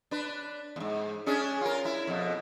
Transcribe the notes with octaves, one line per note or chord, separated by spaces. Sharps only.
D4 B4
E2 G#2
C#4 D4 G#4
F4 A#4
E4
F2 B2